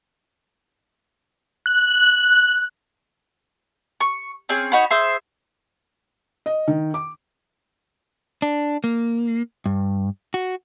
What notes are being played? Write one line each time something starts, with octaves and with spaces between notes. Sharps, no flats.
F#6
C#6
C4 C#4 G#4
D#4 F#4 C#5 B5
G#4 C5 E5 C6
D#5
D#3
D6
D4
A#3
G2
F#4